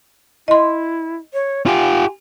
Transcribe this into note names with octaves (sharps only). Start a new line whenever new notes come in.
E4 D#5 C6
C#5
F4 G4 G#5